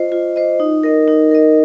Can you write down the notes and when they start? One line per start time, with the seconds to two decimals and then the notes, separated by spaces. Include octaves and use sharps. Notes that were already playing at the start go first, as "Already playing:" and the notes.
Already playing: F4 C5 D#5
0.12 F4
0.36 C5 D#5
0.60 D#4
0.83 A#4 D#5
1.08 D#4
1.31 A#4 D#5